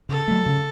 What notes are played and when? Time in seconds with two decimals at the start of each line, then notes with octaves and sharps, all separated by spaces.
0.09 C#3 A4
0.28 F#3 A3
0.46 C#3